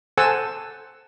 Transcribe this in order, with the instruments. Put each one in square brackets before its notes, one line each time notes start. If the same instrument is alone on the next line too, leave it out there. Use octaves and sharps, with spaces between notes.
[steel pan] A4 C5 F#5 G#5 A5 E6